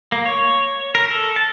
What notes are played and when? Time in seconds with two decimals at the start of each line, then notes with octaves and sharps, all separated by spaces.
0.12 A#3
0.25 C#5
0.95 A#4
1.10 A4
1.36 A5